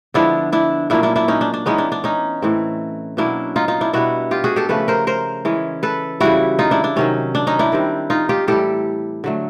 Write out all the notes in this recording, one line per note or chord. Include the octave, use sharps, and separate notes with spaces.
D3 F3 G#3 B3 D4 E4
D4 E4
A#2 F#3 A#3 C#4 D4 E4
D4 E4
D4 E4
C#4 D#4
D4
D4
E3 G#3 B3 C#4 D#4
D4
D4
C#4 D#4
A2 E3 A3 C4
B2 F#3 A#3 C#4 D4 E4
D#4 F4
D#4 F4
D4 E4
B2 G3 B3 E4 F#4
F4 G4
F#4 G#4
G4 A4
C#3 F3 A3 C#4 A4 B4
A#4 C5
A#4 C5
E3 G#3 C#4
A4 B4
C#3 E3 G3 E4 F#4
D#4 F4
D4 E4
D4
C3 D#3 F#3 C#4
D4
C#4 D#4
D4 E4
D#3 G3 C4
D#4 F4
F4 G4
A2 E3 G3 G4 A4
D3 F#3 A3